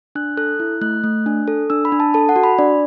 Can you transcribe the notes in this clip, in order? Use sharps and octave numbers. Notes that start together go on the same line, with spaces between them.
D4 F#6
A4 F#6
E4
A3 F#6
A3
D4
A4
D4 E6
B5
D4
A5
A4 A5
F#5
F#4
B5
D4 D5